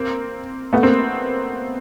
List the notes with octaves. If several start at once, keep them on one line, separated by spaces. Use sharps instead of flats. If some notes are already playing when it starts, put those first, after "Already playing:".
Already playing: A#3 C4
A3 B3
A#3 C4